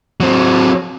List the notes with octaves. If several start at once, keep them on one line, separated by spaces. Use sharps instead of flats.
F#3 C4